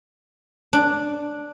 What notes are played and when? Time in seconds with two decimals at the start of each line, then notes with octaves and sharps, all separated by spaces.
0.73 D4